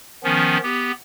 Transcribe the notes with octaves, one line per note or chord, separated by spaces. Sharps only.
D#3 F3 B3 C#4
B3 G4